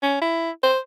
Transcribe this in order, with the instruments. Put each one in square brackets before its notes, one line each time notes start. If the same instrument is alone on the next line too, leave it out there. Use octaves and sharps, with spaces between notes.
[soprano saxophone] C#4
E4
C5